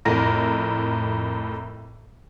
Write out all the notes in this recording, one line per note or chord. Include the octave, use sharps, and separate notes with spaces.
F2 A2 A#4 A#6